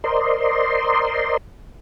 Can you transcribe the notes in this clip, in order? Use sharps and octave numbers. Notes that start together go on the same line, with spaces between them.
A#4 C5 D5 D#5 C6